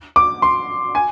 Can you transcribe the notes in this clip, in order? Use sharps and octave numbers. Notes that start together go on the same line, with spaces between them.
D6
C6
G#5